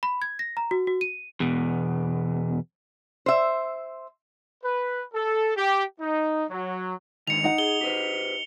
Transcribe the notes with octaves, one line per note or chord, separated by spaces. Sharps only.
B5
G#6
A#6
A#5
F#4
F#4
D#7
E2 B2
C5 E5
B4
A4
G4
D#4
F#3
G#2 D3 D#3 C#7 F7
D#4 F#5
G#4 G7
G4 B4 C5